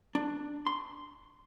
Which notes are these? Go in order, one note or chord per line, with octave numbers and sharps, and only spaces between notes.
D4
C6